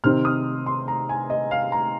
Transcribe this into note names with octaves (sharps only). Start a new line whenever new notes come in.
C3 D#3 C4 D#4 F6
D#6
C6
A#5
G#5
D#5
F5
A#5